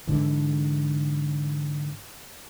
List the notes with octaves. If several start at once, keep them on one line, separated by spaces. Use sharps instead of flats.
G#2 D3 E3